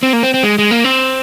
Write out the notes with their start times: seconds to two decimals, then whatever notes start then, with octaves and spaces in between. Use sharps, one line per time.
0.03 C4
0.13 A#3
0.23 C4
0.34 C4
0.43 G#3
0.58 G#3
0.71 A#3
0.84 C4